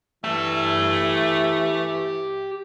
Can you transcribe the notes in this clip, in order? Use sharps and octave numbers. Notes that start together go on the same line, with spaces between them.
E3 A3 G4 A5